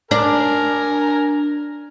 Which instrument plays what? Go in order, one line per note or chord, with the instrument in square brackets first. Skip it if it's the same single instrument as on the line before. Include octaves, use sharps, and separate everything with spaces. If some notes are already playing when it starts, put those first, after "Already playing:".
[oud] D4 [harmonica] A#4 G#5 A#5